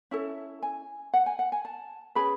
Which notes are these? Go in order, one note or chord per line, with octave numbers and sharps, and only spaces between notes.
C#4 E4 A4 E5
G#5
F#5
G#5
F#5
G#5
A5
C#4 G#4 B4 B5